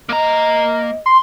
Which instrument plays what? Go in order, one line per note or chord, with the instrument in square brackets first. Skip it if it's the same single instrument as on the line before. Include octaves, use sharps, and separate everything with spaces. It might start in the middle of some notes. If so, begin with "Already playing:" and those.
[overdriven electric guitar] A#3 A#5 [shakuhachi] D#5
[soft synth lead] C6